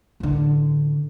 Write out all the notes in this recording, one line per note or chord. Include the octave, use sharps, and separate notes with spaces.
A1 D3